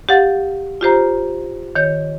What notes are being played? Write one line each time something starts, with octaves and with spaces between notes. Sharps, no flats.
G4 F5 F#5 A6
F4 G4 C5 A#5
D#3 C#5 G6